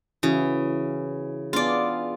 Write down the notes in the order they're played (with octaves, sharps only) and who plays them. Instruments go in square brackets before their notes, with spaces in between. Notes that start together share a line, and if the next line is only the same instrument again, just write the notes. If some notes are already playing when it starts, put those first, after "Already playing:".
[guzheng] C#3 [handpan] E3 E4 F#4
[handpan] B3 D4 G#4 [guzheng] F4 D5